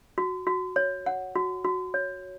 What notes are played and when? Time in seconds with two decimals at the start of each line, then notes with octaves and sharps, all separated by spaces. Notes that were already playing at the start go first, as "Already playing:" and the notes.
0.18 F#4
0.47 F#4
0.76 C#5
1.06 F#5
1.36 F#4
1.64 F#4
1.94 C#5